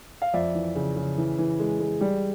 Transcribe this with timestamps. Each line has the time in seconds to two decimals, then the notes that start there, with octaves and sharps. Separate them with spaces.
0.22 F5
0.34 F2 D5 E5
0.54 E3
0.75 C#3
0.96 C#3
1.18 E3
1.38 E3
1.60 G#3
1.80 G#3
2.01 G3